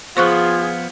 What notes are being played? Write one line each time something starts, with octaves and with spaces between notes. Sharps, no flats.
F3 B3 F4 G#4 C5 C#6 F#6